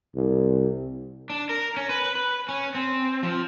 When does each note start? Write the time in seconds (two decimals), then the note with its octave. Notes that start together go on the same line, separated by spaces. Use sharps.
0.16 C2
1.30 D4
1.49 A#4
1.77 C#4
1.89 B4
2.15 B4
2.49 C#4
2.75 C4
3.23 F3